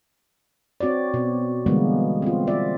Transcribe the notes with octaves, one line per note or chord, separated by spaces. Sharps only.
C4 F#4 C#5 D5
B2
D3 E3 G3 G#3 A#3 B3
C4 F4
F4 D5 E5